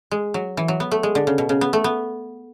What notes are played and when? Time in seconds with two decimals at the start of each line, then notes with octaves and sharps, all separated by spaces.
0.11 G#3
0.34 F#3
0.57 E3
0.68 F#3
0.80 B3
0.91 A3
1.03 G#3
1.15 D3
1.27 C#3
1.38 B2
1.49 C#3
1.61 B3
1.73 A3
1.84 B3